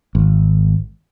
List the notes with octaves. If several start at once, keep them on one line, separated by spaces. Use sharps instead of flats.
G#1